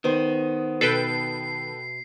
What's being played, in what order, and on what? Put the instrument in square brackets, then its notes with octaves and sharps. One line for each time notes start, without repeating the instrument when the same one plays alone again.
[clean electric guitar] D#3 [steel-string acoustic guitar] B3 C5
[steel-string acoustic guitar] B2 [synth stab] A4 B4 G5 [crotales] C7